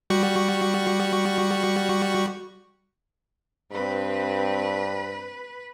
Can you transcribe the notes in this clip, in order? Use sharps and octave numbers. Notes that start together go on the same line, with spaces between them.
G3 F#4 C#6
G2 C4 B4